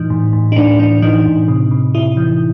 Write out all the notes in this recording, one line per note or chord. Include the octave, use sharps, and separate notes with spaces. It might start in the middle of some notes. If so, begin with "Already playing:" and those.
Already playing: A2 E3 D#4
A2
A2
D#4
A2 D4
E3 D4
E3 D#4
A2
C3
C3
C3 E4
E3